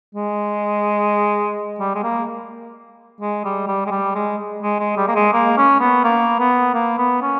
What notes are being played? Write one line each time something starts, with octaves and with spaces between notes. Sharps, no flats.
G#3
G3
G#3
A#3
G#3
G3
G3
G#3
G3
G#3
G#3
G#3
G3
A#3
G#3
A#3
C#4
B3
A#3
B3
A#3
B3
C#4